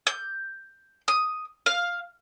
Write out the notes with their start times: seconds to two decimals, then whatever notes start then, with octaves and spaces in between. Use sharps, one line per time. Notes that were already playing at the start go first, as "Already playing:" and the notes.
0.07 G6
1.08 D#6
1.66 F5